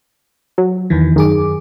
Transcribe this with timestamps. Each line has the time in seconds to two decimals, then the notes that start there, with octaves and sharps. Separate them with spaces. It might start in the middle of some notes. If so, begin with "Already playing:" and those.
0.58 F#3
0.90 E2 D#3 E3
1.16 F#2 D#3 G#4 D6